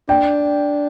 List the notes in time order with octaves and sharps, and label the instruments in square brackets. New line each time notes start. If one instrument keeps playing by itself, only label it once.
[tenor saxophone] D4 [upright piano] G5